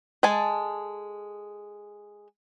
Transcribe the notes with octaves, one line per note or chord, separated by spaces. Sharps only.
G#3 A4 G#5 A5